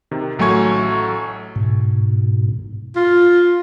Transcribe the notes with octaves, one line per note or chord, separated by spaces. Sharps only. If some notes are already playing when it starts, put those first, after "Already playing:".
C3 D#3
A1 F#3 A3 G#5 C#6 G#6
G#2 B2
F4 A#6